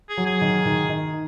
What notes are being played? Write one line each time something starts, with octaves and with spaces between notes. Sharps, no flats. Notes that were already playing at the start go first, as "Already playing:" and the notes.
G#4
F#3
G#4
D#3
D#3
D#3